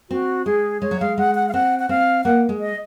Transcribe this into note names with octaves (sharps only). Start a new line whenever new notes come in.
C4 F#4
G#3 G#4
G#3 C#5
F#3
G#3 F5
G#3 F#5
F#5
F5
C4 F#5
F#5
C4 F5
A#3 F#5
G#3
D#5